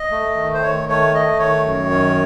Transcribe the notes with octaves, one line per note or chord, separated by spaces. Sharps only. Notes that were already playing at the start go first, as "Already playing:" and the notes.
Already playing: D#5
A3
D#3
C5
D#3 C#5
A3 C#5
A3 D#5
D#3 C#5
F#2
D#3